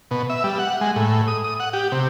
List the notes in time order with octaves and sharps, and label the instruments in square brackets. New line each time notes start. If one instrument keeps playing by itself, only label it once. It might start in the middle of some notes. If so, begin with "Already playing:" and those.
[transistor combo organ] B2
E5
G3
F#5
G#3
A2
D#6
D#6
F#5
G4
C3